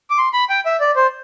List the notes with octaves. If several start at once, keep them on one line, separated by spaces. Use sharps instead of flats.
D6
C6
B5
G5
E5
D5
C5